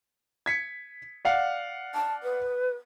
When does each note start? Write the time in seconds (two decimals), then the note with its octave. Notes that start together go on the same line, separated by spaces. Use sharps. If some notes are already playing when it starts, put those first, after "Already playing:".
0.46 G#6 B6 C#7
1.25 D5 F5 F#5
1.94 A5
2.23 B4